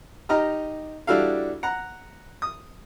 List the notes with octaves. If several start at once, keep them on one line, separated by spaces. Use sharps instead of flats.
D#4 G4 D#5 A#5 F6
G3 D4 E4 F#4 A4 F5
F#5 A#5
D#6